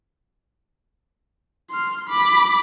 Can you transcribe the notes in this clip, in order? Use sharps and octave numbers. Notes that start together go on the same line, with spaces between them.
C6 F6
B5 D6